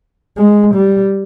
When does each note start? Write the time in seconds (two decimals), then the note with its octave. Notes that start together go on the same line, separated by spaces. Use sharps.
0.37 G#3
0.75 G3